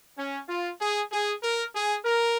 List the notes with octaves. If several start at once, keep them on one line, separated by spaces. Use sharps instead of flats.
C#4
F4
G#4
G#4
A#4
G#4
A#4